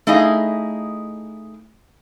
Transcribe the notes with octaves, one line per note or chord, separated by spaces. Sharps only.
A3 D#4 E4 G#4 D#5 F5